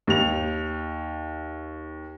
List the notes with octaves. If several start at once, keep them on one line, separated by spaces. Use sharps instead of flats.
D#2 F7